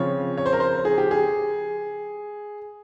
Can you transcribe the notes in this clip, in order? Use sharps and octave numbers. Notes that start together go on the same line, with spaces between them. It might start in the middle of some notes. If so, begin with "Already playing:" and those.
Already playing: C#3 F3 C4 C#5
C#5
C5
A#4
C5
G#4
G4
G#4